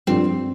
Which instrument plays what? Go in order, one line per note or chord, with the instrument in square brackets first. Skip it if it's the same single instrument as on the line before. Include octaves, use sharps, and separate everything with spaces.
[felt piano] G2 F3 D4 G4 [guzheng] C4